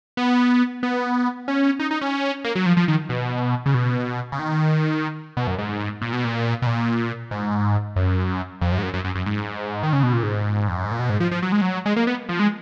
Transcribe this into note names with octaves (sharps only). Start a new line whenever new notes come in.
B3
B3
C#4
D#4
D#4
C#4
A#3
F#3
F3
F3
D#3
B2
C#3
B2
C#3
D#3
B2
F#2
G#2
A#2
B2
A#2
B2
A#2
G#2
F#2
F2
F#2
G#2
F#2
F#2
F#2
F#2
G#2
D#3
C#3
B2
A#2
G#2
F2
F#2
G#2
A#2
B2
G#2
F3
F3
F#3
G#3
F#3
G#3
A#3
B3
F3
G#3